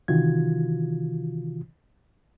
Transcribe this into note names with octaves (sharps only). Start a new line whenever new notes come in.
C3 D#3 E3 F4 F#4 G#6